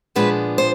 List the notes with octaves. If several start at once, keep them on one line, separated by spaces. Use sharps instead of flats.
A#2 F3 G#3 B3 D4 B4
C5